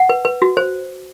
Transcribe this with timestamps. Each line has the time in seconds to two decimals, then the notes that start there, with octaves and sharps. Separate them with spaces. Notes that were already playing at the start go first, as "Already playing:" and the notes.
Already playing: F#5
0.09 B4
0.25 B4
0.42 F#4
0.57 C5